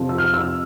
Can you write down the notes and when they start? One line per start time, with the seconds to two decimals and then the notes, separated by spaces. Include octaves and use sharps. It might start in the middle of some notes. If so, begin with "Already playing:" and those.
Already playing: F2 C3 F3
0.09 E6
0.18 F6
0.34 E6